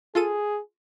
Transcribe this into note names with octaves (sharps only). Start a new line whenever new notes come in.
F4 G#4 A4 D#7